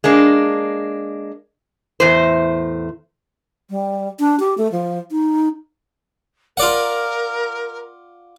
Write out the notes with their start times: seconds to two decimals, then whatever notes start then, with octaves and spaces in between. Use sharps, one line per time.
0.04 G#3 A#3 D4
2.00 E2 A2 C5
3.70 G3
4.19 D4
4.40 G4
4.58 A3
4.72 F3
5.11 D#4
6.57 F4 A#4 D5 F#5